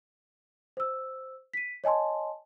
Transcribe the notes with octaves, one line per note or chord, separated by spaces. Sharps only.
C5 E6
B6 D#7
C#5 D#5 G#5 A5 C6